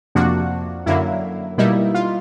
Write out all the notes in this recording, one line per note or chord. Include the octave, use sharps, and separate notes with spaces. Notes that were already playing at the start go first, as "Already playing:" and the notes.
F2 C3 F3 A#3 D4 F#4
F#2 D3 F#3 A#3 E4
B2 G3 A#3 D#4 E4
F4